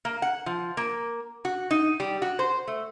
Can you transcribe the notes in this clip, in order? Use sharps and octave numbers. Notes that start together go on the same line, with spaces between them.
A#3
F#5
F3
A#3
F#4
D#4
G3
F#4
C5
A3